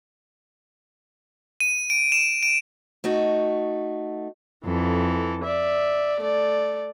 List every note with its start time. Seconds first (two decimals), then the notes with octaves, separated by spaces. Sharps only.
1.60 D#7
1.90 D7
2.12 E7
2.43 D7
3.04 A3 D#4 F#4
4.65 F2 E3 A4
5.44 D5 E5
6.22 A3 D5